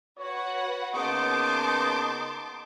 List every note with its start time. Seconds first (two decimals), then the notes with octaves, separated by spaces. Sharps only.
0.18 F#4 B4 C#5 F#5
0.95 C#3 A#3 B3 D#4 A5 C6 D6